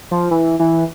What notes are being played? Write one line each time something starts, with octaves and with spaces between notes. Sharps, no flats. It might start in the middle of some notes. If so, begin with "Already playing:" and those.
F3
E3
E3